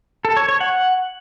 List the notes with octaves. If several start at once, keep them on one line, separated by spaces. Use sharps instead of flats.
A4
C#5
C#5
F#5